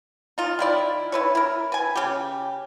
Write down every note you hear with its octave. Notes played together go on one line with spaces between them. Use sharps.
D#4 F4
D#3 E4 D5
E4 B4 C#5
E4 A#4
B4 G#5
C#3 G4